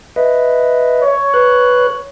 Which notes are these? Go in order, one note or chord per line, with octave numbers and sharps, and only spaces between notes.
B4 D#5 E5
C#5
B4 F#6